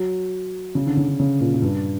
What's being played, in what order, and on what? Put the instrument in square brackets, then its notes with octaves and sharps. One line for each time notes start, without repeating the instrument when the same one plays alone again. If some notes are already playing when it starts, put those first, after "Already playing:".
Already playing: [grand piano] F#3
C#3
D3
C#3
D3
C#3
A#2
A#2
G2